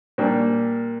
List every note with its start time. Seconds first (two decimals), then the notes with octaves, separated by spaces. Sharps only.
0.18 A#2 G3 A#3 D4